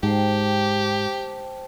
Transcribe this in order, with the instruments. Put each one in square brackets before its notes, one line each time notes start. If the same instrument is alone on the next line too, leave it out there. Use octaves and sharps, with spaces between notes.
[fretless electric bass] G#2 [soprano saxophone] G4 [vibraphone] C5 G5 A5